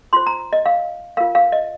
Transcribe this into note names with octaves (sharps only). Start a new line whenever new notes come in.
F4 C5 C6
A#5
D#5
F5
F4 A#4 F5
F5
D#5